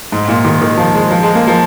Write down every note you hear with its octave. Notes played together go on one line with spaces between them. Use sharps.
G#2
A#2
D#3
D#3
F3
G#3
F3
G#3
A#3
F3